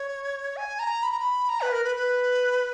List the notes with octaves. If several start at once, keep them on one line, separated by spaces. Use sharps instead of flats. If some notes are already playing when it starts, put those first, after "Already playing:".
Already playing: C#5
G#5
A#5
B5
A#5
B5
A#5
B4
A#4
B4
B4